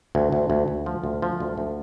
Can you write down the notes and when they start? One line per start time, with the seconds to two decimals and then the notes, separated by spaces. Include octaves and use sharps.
0.15 D2
0.32 D2
0.50 D2
0.68 D2
0.86 F3
1.04 D2
1.22 F3
1.40 D2
1.58 D2